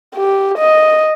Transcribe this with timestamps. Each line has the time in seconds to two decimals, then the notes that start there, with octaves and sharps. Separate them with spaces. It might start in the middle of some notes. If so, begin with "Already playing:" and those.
0.16 G4
0.58 D#5